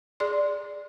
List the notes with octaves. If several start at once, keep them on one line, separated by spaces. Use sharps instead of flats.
G#4 D5 C6